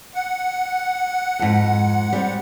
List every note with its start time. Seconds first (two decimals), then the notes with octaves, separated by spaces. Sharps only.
0.15 F#5
1.39 F2 G#2
2.13 G3 C4